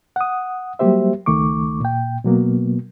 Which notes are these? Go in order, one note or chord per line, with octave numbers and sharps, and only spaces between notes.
F#5 D#6
F#3 G3 A#3 G4 C5 E5
C#2 D#3 A3 C#6 D6
A#2 G5
B2 F#3 A#3 B3